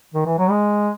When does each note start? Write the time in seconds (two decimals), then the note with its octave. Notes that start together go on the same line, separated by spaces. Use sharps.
0.14 D#3
0.26 E3
0.38 F#3
0.50 G#3